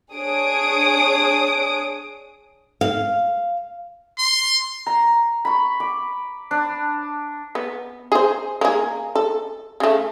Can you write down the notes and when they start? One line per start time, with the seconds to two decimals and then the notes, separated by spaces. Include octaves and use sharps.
0.14 D4 G#4 C#5 D#6 D7
2.81 F5
4.18 C6
4.86 A#5
5.45 B5 C#6
5.80 D6
6.51 D4
7.55 B3
8.12 G#4 C5
8.61 A#3 G#4
9.15 A4
9.80 C#3 A3